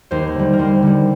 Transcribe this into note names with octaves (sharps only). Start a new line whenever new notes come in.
D#2 C5
D3 G3
A#4
D#2 C5
D3 G3